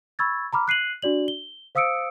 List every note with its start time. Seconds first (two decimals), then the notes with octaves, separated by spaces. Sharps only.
0.19 B5 C#6 E6 G#6 A6
0.53 A#5 B5 D6 F6
0.68 F#6 C7 D#7 F#7
1.02 D4 F#4 D5 F#7
1.28 G7
1.75 C5 F5 D#6 E6 C#7 D7